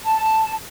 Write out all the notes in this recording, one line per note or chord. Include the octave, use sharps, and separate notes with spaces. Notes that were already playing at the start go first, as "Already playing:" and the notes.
A5